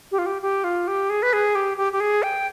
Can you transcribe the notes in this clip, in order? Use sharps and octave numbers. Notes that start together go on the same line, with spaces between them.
G4
F4
G4
G4
F4
G4
G#4
B4
G#4
G4
G4
G4
G#4
G5